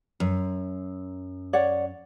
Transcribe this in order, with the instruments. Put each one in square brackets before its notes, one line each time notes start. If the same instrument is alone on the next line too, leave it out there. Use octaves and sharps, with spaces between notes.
[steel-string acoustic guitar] F#2
[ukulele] C#5 D5 F#5